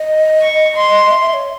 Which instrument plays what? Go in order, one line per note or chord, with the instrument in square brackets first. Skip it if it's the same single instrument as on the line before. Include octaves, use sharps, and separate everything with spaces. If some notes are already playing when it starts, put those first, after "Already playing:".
Already playing: [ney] D#5
[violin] C#6
C6
[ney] E5
E5
C#5